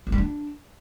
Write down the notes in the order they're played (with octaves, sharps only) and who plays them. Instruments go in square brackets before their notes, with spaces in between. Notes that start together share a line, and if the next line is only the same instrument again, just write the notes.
[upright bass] A3
G3
D4